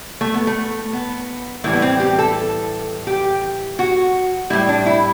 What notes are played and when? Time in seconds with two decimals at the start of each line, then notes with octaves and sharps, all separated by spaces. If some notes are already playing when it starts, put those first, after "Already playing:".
0.21 A3
0.34 B3
0.47 A3
0.93 B3
1.64 A2 E3 G3 A3
1.73 B3
1.82 C4
2.00 G4
2.19 A4
3.07 G4
3.79 F#4
4.50 A2 G3 E4
4.69 D4
4.86 E4